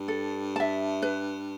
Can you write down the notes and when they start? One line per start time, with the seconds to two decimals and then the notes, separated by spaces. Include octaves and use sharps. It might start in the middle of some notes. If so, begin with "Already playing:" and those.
Already playing: G2
0.08 A4
0.56 E5 A5
1.02 B4